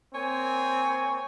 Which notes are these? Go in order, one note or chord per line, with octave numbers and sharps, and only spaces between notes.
A#3 C4 C#5 G#5